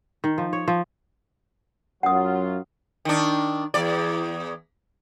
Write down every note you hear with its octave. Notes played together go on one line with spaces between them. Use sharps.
D#3
F3
C#5
F3
F#2 F#3 F4 F#5 D#6
D#3 D4
E2 D5